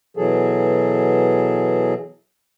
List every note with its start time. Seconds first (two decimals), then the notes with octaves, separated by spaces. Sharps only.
0.17 B2 E3 F#3 G#4 A4